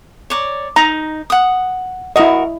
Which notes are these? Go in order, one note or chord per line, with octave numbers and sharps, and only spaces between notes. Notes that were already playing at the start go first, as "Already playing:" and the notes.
C#5 D5 A#5
D#4 A#5
F#5 D#6
E4 F#4 A#4 D#5